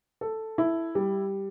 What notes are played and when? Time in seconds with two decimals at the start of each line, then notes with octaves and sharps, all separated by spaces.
0.21 A4
0.58 E4
0.95 G3